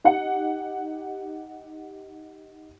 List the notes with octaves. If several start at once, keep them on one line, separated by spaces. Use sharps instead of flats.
D#4 G4 F#5 C#7